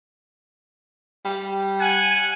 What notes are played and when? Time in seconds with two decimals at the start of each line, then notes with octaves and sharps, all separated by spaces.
1.25 G3
1.80 F#5 G#5